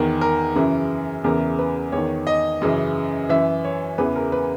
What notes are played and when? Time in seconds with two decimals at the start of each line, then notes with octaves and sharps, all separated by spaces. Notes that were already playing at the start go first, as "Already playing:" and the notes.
Already playing: E2 D#3 A#4
0.21 A#4
0.55 F#2 C#3 E3
1.24 E2 C#3 E3 A#4
1.59 B4
1.92 E2 D#3 C#5
2.27 D#5
2.62 F#2 C#3 E3
3.29 F#2 E3 E5
3.64 C#5
3.98 E2 C#3 E3 B4
4.16 A#4
4.32 B4